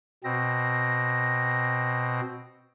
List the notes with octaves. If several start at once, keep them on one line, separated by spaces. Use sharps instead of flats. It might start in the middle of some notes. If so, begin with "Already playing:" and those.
B2 C4 A#6